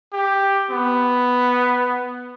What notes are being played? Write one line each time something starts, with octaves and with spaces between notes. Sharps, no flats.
G4
B3